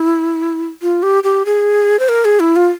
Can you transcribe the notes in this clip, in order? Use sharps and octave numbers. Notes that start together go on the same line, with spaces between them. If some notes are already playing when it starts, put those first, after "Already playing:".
Already playing: E4
F4
G4
G4
G#4
C5
A#4
G#4
E4
F4